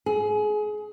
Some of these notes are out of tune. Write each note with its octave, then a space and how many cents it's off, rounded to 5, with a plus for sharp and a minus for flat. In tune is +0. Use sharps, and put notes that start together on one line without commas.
G#4 +25